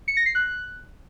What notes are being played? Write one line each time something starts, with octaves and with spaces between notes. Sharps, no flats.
C#7
A#6
C7
F#6